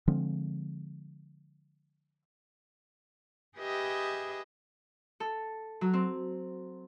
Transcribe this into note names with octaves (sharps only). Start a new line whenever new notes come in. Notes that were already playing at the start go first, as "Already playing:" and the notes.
D3 F3 G#3 C4
G4 G#4 B4 D#5 E5 G5
A4
F#3
C4